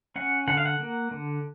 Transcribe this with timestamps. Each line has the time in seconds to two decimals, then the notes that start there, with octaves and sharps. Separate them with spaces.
0.16 C#4 F#5
0.47 D3 F#5
0.57 F5
0.66 F#5
0.79 A#3
1.11 D3